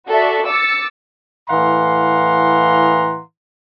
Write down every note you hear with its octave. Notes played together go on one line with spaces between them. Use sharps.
F#4 A4 D5 E5
D6 E6 A6 C#7
A2 E3 F5 F#5 A#5 C6